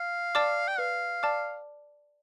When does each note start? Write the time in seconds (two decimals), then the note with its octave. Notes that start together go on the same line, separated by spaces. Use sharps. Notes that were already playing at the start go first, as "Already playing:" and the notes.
Already playing: F5
0.35 D5 A5 D6 F6
0.68 G5
0.78 B4 F5
1.23 D5 A5 D6 F6